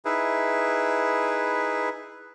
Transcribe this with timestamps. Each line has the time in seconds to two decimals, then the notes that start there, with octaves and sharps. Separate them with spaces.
0.05 D#4 E4 G#4 B4 E5